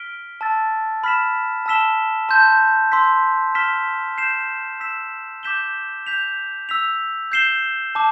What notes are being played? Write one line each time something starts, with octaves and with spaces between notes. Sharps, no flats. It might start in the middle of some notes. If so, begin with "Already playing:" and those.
Already playing: F6 B6 D7 G7
A5 E6 A6
B5 F6 B6 E7
A5 E6 B6 E7 G7
A5 C6 G6
C6 E6 G6 B6
F6 B6 E7 G7
G6 C7 E7
E6 B6 E7
D6 G6 B6 E7 G7
G6 B6 F7
E6 B6 F7
G6 C7 E7 G7
A5 D6